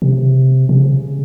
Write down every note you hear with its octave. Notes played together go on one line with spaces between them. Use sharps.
C3
C3
C#3